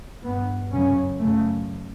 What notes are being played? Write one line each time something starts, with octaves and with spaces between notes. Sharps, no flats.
G2 B3
F#2 C#3 C#4
F#2 C#3 A3